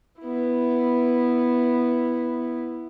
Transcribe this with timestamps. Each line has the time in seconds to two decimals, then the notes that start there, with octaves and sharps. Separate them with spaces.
0.21 B3 E4